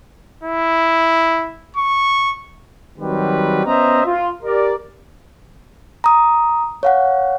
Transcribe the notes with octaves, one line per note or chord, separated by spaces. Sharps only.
E4
C#6
D#3 F#3 G3 C4 F#4 B4
B3 C#4 C5 D#5 E5 A#5
F4
G4 A#4 D5
A#5 D#6
C#5 F5 F#5